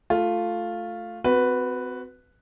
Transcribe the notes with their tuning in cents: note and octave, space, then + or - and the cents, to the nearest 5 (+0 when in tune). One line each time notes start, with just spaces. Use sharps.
A3 +0 F4 +0
C4 -30 F#4 +0 B4 +0